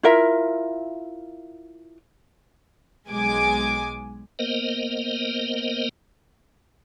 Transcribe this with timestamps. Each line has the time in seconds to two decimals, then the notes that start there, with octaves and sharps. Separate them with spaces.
0.03 E4 F4 A#4 E5
3.08 B1 G#3 G#5 D6
4.39 A#3 B3 A#4 C5 D#5